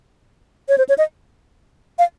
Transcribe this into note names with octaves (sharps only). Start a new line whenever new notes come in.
C#5
C5
C#5
D#5
F5